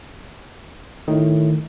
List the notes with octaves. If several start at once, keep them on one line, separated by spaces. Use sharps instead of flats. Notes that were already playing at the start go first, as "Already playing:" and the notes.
A2 D#3